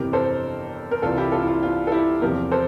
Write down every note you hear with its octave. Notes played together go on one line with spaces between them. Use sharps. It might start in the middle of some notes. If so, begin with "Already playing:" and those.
Already playing: G1 F2 C3 E3 G4 A#4
A4 C5
A#4
C2 C3 E3 F4 A4
E4 G4
F4 A4
E4
F4
F4
A4
E4 G4
E2 C3 F3 G4 A#4
A4 C5